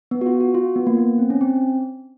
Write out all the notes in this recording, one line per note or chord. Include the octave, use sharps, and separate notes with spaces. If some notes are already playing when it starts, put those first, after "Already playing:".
B3
F#4
F4
F#4
F4
B3
A#3
B3
C4
C#4
C4